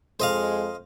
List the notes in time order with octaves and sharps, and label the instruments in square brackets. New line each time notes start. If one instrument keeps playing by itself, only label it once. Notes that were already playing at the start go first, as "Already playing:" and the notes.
[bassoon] F2 [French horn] G#3 [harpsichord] C5 D#5 F5